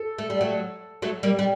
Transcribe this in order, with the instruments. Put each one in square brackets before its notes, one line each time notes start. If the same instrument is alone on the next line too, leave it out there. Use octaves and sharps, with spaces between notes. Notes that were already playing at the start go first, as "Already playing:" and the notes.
Already playing: [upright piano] A4
[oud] A3
G3
F#3 A3
F#3 A3
G3 A#3
G3